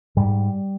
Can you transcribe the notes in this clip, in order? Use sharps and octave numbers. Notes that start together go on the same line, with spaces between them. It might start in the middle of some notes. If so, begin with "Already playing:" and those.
G#2 G3